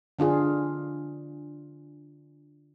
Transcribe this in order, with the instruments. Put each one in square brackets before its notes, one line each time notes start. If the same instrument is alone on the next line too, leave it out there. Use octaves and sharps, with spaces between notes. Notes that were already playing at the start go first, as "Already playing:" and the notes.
[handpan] D3 D4 F4 G#4